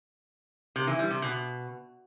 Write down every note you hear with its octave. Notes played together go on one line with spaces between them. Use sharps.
C3
E3
G3
C3
B2